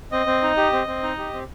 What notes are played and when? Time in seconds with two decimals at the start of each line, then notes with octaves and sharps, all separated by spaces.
0.12 C4 D#5
0.26 C4
0.42 D#4
0.57 G4
0.73 C4
0.87 C4
1.03 D#4
1.18 G4
1.33 C4